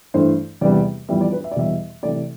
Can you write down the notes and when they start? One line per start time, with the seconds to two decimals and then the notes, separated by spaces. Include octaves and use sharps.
0.14 G2 E3 A3 C5
0.61 E2 C3 G3 B3 D5
1.09 F2 E3 G3 B3 E5
1.21 D5
1.32 B4
1.44 E5
1.51 D5
1.56 E2 B2 G3 E5
2.03 C3 E3 A3 D5